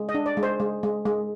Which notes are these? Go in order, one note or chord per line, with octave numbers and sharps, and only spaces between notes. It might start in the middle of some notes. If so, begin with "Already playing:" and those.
Already playing: G#3
D#5
D4
D5
G#3
C5
G#3
G#3
G#3